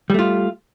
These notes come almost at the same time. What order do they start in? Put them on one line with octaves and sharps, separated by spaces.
G3 A3 F4